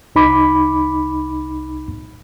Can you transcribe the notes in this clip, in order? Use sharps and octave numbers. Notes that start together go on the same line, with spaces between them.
C2 D#4 B5 D6